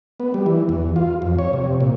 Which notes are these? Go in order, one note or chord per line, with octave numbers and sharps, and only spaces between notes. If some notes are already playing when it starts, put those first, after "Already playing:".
B3
G3
E3
E2
F4
F2
C#5
C3
A#2